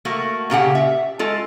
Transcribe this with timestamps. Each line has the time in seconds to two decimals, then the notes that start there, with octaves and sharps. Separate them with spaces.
0.05 A3 A#3 F#4
0.50 A#2 C#3 G4 F#5
0.75 E5
1.19 G#3 F4 A4